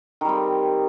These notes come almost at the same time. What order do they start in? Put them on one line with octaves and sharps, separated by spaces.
D#3 G3 C4